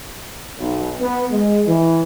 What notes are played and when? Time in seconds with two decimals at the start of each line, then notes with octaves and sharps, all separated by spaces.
0.60 B1
1.00 B3
1.31 G#3
1.66 E3